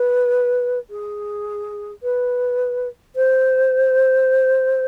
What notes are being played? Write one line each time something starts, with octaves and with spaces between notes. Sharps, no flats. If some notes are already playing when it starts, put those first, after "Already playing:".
Already playing: B4
G#4
B4
C5